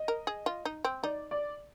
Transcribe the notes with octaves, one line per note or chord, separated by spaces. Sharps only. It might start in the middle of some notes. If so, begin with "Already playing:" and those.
Already playing: D#5
A#4
G#4
F4
D#4
C4
D#4 D5
D5